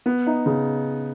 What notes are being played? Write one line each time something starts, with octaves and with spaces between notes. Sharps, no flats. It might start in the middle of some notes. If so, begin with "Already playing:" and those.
B3
D#4
C#3